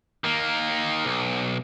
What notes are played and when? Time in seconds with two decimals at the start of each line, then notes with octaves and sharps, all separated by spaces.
0.24 D#3 A#3
1.05 B1